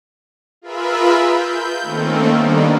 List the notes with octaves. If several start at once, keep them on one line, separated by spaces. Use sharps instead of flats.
F4 G#4 A#4 B4 E5 B5
G6
D#3 A3 A#3 C4 C#4
D#3 G3 A#3 B3 D4 D#4